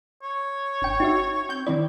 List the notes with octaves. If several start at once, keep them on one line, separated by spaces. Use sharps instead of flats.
C#5
G1 G5
D#4 F#4 E5
C4 G6
D#3 C4 E4 D5